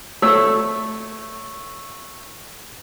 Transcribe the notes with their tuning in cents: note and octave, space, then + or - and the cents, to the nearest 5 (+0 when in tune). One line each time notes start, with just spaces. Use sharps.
A3 +0 C#5 +0 E6 +0